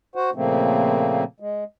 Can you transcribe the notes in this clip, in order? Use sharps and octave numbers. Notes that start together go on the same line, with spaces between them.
F#4 C5 F#5
A#2 C#3 F3 A3 A#3 C4
G#3